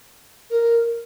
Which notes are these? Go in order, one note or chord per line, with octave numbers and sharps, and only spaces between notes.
A#4